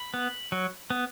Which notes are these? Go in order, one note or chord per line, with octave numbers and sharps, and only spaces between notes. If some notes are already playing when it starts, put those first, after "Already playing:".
Already playing: B5
B3
F#3
B3